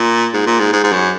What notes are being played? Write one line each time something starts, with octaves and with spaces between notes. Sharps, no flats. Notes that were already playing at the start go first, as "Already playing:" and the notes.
Already playing: A#2
G#2
A#2
G#2
G#2
G#2
F#2